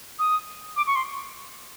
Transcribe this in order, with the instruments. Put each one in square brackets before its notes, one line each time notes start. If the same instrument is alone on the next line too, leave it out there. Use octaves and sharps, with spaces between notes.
[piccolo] D#6
D6
C#6
C6